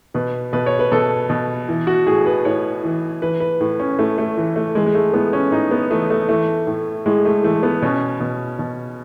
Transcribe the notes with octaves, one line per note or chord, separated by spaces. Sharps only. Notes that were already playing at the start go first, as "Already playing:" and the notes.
B2 B4
B2 B4
C#5
B4
B2 A4
B2
E3
F#4
A2 G#4
B4
A2 C#5
E3
E3 B4
B4
A2
C#4
A2 A3
A3
E3
A3
E3 G#3
G#3
A3
A2 B3
C#4
A2 D#4
B3
E3 A3
A3
E3 A3
A2
A2 G#3
A3
E3 A3
B3
B2 C#4
B2
B2